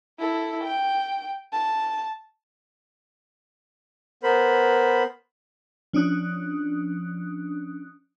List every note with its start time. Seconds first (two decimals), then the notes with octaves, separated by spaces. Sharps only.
0.19 E4 A4
0.64 G5
1.53 A5
4.23 B3 A#4 C5 B5
5.93 F3 C#4 D4 D#6 F#6